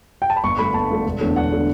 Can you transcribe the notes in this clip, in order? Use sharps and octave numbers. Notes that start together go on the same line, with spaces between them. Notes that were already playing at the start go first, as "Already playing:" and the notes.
G5
A5
B5
G1 C#6
G2 D3 A3 B5
G1 A5
G2 D3 A3
E1
E2 D3 A3 C#4
E1 F#5
D3 A3 C#4